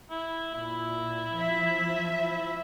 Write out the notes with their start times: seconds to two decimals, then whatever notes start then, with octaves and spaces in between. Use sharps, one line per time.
0.11 E4
0.54 A#2 E4
1.33 F3 E5
2.22 E4